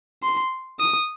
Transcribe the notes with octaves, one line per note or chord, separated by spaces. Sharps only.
C6
D#6